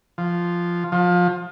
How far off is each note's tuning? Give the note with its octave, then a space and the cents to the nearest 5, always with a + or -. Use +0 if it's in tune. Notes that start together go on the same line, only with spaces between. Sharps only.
F3 -5
F3 +25